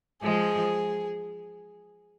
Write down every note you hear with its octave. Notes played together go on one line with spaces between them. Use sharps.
F3 G#3 G#4